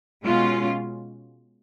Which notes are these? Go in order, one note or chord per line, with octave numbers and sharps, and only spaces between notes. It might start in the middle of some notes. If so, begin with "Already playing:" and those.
B2 G#3 C#4 F4